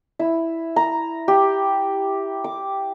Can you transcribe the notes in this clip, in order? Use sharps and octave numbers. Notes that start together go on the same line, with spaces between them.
E4
A#5
G4
D6